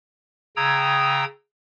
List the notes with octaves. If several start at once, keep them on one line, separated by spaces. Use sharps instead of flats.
C#3 G5 A#5 D#6 E6 G#6